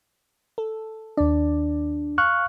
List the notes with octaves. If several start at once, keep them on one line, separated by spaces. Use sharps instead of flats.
A4
D#2 D4 D5
F5 C#6 F6 F#6